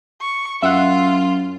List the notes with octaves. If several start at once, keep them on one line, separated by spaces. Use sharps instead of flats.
C#6
F#2 F4 E5 F#5